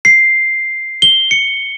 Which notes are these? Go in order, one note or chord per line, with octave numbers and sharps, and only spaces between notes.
C7
G7
C#7